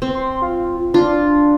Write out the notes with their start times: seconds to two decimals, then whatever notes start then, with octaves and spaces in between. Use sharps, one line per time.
0.02 C4
0.15 C6
0.42 F4
0.94 D4 F4